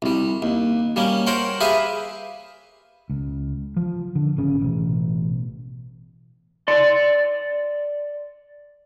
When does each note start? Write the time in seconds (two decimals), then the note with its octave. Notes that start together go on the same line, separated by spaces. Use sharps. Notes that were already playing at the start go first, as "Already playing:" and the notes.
0.02 C2 G3
0.42 D#2
0.96 G3 A#3 C#4
1.27 A#4 C5 C#5 F#5 G5
1.60 G4 G#4 B4 E5 F5 G#5
3.10 C#2
3.77 F3
4.15 D3
4.37 G#1 C#3 C#4
4.61 A1 B2
6.68 D5 C6